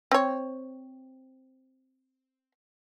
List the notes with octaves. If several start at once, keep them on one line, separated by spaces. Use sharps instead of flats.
C4 C#5